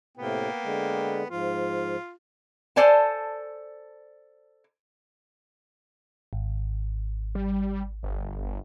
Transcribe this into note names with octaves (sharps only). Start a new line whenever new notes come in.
A2 C3 A#3 B3 G5
D3 G#3
G#2 F3 F4
A4 C5 D5 G#5 A5
G#1
G3
G1